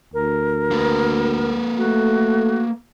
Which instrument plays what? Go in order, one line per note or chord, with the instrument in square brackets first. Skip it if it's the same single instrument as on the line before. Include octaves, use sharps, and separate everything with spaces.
[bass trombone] D2 [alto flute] A#4
[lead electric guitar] A#3 B4
[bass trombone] A3 [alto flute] F#4